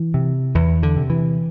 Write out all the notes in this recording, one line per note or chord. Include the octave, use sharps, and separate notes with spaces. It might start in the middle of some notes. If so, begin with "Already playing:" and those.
Already playing: E3
C3
E2 E3
D3
C3
E3